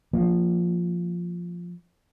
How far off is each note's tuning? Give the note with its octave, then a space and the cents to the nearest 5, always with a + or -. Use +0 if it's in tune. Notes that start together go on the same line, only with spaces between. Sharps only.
F3 +0 A#3 +0